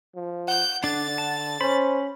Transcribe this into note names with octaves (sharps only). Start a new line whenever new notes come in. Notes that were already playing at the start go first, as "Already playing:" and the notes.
F3
F#5 G6
D3 D4 A6
A5
C#4 C5 B5